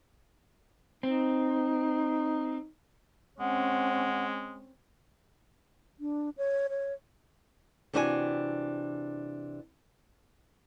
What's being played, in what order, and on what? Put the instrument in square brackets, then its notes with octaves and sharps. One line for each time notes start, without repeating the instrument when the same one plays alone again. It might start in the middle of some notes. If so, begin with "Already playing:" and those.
[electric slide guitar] C4 [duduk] D#4
[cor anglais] G#3 [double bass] C4 C#4 [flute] F#5
[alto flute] D4
C#5
C#5
[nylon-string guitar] C3 E3 D4 F#4 C5 G#5